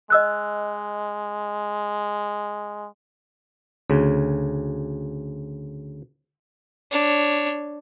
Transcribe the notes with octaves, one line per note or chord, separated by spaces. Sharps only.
G#3 D#5 E6 F#6
D2 C#3
D4 C#5